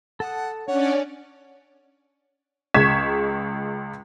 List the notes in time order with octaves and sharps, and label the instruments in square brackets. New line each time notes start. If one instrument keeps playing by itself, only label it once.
[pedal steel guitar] A4 A5 D#6 [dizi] F#5
[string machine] C#4 D5 [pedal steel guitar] D4 [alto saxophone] C#5 [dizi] F#5
[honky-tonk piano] C#2 G#3 C#6 G#6 B6 E7